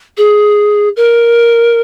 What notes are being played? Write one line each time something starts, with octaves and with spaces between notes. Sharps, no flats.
G#4
A#4